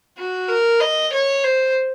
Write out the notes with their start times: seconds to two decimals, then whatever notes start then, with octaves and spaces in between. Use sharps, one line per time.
0.18 F#4
0.49 A#4
0.80 D#5
1.13 C#5
1.44 C5